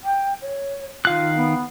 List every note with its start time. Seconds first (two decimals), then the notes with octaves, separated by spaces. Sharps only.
0.04 G5
0.42 C#5
1.05 D#3 F4 F5 F#6
1.37 B3